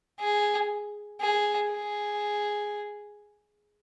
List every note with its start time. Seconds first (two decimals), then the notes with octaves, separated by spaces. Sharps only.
0.20 G#4
1.21 G#4
1.72 G#4